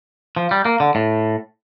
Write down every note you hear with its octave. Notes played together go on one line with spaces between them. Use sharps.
F3
G3
A#3
D3
A2